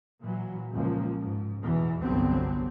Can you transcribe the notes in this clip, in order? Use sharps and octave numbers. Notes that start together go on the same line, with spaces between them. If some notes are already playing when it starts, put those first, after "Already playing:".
A#2 E3 F#3
C#2 A#2 F3 A#3
G#2
E2 B2 E3
G1 C2 D3 F#3 B3 C4